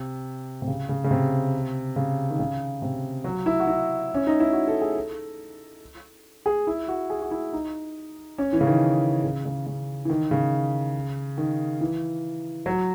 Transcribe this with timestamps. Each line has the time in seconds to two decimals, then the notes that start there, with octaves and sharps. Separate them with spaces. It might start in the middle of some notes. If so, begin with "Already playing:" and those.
Already playing: C3
0.62 C3
0.67 C#3
0.89 C#3
1.04 C#3
1.11 C3
1.96 C#3
2.30 D#3
2.39 C#3
2.82 C3
3.24 F#3
3.46 E4
3.60 F#4
3.67 E4
4.14 C#4
4.27 D#4
4.40 E4
4.53 F#4
4.67 A4
4.82 G#4
4.95 A4
6.46 G#4
6.67 E4
6.88 F#4
7.10 G#4
7.22 F#4
7.31 E4
7.53 D#4
8.38 C#4
8.53 E3
8.61 C#3
8.67 D#3
9.23 C#3
9.45 C#3
9.66 C#3
10.05 E3
10.09 D#3
10.31 C#3
11.38 D#3
11.81 E3
12.66 F#3